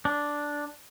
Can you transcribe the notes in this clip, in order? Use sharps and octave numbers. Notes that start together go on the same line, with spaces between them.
D4